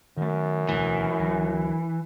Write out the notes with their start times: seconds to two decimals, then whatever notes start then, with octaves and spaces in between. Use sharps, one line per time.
0.17 F#2 D#3 A3
0.69 E1 D2 E3 A3
1.19 D2 F#3